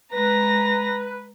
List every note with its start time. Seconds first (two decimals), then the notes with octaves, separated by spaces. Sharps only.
0.13 G#3 B4 A#5 A#6